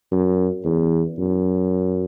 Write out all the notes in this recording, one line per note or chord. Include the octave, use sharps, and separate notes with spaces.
F#2
E2
F#2